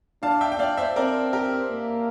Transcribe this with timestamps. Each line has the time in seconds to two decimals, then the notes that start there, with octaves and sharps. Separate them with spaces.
0.23 D4 F5 A5
0.41 E5 G5
0.52 G5
0.59 D5 F5
0.77 C5 E5
0.96 C4 A#4 D5
1.33 G4 A#4
1.71 A#3